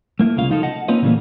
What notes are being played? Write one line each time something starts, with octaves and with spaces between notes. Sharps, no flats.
A3 A#3 E4
C2 C#3 F4 F5
F3 D#4 F4 G#4 A4
D#5 F#5 A5
A#3 C4 C#4 F4 B4 D#5
A#2 C#3 E3 G3 A3 A#3